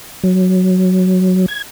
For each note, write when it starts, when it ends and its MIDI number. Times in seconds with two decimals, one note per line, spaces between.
0.24 1.46 54
1.48 1.62 92